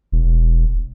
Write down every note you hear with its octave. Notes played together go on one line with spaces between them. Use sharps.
E1